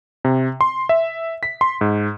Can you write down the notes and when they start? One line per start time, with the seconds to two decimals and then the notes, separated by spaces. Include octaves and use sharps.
0.25 C3
0.61 C6
0.89 E5
1.43 B6
1.61 C6
1.81 G#2